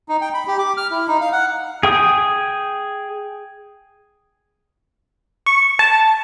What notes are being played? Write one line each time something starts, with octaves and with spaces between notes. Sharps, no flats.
D#4
G5
B5
G4
D6
F6
E4
D#4
F5
F#5
G#4 G5 D#6
C#6
A5